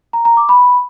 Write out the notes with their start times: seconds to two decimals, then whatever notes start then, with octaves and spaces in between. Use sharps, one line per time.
0.13 A#5
0.25 A#5
0.37 D6
0.49 B5